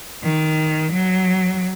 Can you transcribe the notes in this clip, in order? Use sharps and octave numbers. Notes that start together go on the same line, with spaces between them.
D#3
F#3